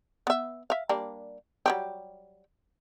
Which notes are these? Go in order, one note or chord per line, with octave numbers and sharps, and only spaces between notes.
B3 E5
E5 F5
G3 A#3 D4
F#3 G3 G4